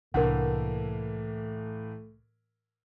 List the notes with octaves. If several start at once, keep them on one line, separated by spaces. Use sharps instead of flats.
C2 A2 E3 A3 A#3 D4 A#4 F#5